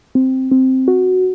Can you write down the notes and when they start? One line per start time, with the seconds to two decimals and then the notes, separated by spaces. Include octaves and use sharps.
0.15 C4
0.51 C4
0.88 F#4